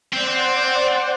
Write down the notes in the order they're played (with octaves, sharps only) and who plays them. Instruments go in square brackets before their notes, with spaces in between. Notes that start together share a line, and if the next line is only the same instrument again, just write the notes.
[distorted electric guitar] C4 [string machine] C5 D5 F#5